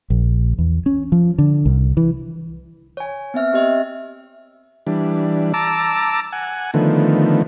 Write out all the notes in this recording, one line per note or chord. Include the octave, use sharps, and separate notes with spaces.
A#1
E2
C#4
F3
D3
C2
E3
C#5 G#5
B3 C4 E5 F6
C4 G4 D#5 E5
E3 G3 D4
A5 A#5 D6 E6
F#5 G#5
D3 D#3 F3 A3 B3